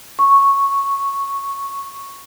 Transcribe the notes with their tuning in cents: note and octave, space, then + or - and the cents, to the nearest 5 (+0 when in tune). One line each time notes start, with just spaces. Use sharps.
C#6 -5